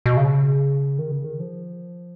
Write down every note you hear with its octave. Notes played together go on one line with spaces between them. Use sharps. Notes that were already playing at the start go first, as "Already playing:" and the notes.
B2
C#3
D#3
C#3
D#3
F3